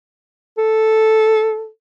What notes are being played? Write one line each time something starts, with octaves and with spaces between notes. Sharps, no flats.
A4